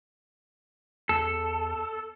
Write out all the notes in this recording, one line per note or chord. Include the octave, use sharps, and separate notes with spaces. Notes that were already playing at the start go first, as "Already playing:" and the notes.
E2 A4